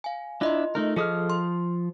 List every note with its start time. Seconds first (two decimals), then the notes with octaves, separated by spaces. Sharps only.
0.04 F5 G#5
0.41 D4 E4 F4 D#5 C6
0.75 A3 D#4 A#4
0.96 F3 G#4 A4 D#5 D#6 F6
1.30 C6